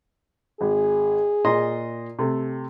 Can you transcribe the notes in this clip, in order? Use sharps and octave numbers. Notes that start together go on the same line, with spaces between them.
G#1 G#4
A#2 D#5 C6
C3 A3